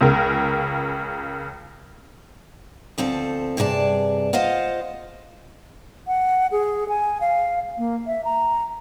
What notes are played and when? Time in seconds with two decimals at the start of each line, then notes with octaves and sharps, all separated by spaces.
0.01 C#2 C#3 A#4
2.98 D2 F3 C4 A4
3.57 G2 C3 G#4 D5 A5
4.33 F4 C5 D#5 F5 F#5
6.07 F#5
6.51 G#4
6.89 G#5
7.21 F5
7.78 A#3
8.07 E5
8.25 A#5